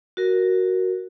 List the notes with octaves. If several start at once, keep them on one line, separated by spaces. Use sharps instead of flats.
F#4 A#4